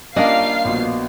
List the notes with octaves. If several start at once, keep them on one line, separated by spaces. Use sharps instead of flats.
G3 A#3 C#4 D4 F4 D#5 F5 C7
A#1 B2